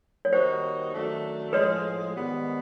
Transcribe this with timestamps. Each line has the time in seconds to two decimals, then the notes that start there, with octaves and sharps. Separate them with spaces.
0.25 C#5
0.32 D#3 G3 A#3 D#4 F#4 C5
0.93 F#2 D#3 F#3 A3 D4
1.53 A2 F3 G#3 B4 C#5
2.14 G#2 D#3 G3 B3